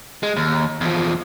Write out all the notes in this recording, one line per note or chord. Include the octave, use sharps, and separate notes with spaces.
G#3
D#2
E2 F3